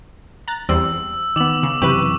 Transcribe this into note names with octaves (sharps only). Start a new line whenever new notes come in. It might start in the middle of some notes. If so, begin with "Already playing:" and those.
A#5 F#6 A6
E2 G3 C4 E6
D#3 B3 D6 F#7
C#3
F#2 C3 E3 G4 B4 C#6 F#7